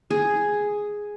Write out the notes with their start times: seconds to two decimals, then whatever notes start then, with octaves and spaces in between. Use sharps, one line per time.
0.10 G#4